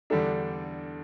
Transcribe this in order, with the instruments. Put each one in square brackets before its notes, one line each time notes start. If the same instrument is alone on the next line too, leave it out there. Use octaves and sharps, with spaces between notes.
[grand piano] E2 D3 G3 D4 [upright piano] A4